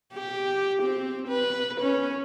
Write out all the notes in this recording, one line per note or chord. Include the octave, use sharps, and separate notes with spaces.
G4
C4
B4
C#4